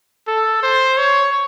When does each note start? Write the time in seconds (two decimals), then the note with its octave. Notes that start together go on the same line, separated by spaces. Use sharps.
0.28 A4
0.63 C5
0.98 C#5